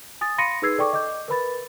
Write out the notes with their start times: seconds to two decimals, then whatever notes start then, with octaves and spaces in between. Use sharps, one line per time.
0.21 G#5 D#6 A6
0.38 F5 B5 C6 A#6 C#7 D#7
0.62 D#4 G#4 B4 E6 G#6 C7
0.78 A4 D5 G5 C#6 D6
0.93 D#5 D6 G6
1.28 A#4 B4 B5 A6